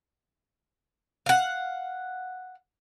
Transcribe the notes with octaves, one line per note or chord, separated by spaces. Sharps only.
F5 F#5